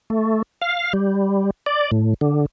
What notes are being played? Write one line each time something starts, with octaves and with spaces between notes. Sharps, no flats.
A3
F5
G3
D5
A2
D3